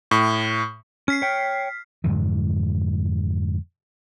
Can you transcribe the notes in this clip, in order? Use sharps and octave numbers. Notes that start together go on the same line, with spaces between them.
A2
C#4 F6 B6 C7
C#5 G5
F2 G#2 D3 E3